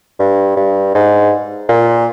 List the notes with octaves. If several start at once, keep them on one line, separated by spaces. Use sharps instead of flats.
G2
G2
G#2
A#2